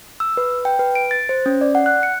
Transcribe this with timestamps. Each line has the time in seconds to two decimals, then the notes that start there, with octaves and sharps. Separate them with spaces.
0.20 E6
0.37 B4
0.65 G5
0.79 B4
0.95 D7
1.11 A6
1.29 C5
1.46 C#4
1.61 D5
1.75 F#5
1.86 F#6
2.03 C#7